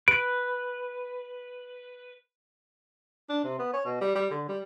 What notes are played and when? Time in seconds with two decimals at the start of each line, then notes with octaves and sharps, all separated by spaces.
0.08 B4 D7
3.29 D4
3.44 C3
3.59 B3
3.73 C#5
3.85 B2
4.01 G3
4.15 G3
4.31 D3
4.49 G3